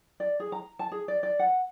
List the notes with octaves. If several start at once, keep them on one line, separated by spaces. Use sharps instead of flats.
D5
G#4
A#5
A5
G#4
D5
D5
F#5